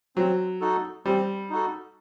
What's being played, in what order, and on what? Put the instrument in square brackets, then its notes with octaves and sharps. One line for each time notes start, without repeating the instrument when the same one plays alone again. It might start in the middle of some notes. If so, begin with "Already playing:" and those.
[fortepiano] F#3 [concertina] C4
[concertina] D#4 F#4 A4
[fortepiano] G3 [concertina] C4
[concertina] D#4 F#4 A4